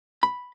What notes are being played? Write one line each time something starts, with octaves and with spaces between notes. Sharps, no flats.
B5